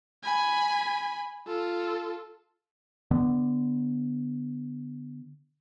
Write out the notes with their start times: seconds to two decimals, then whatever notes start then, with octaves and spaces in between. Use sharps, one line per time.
0.23 G#5 B5
1.47 F4 A4
3.11 D3 B3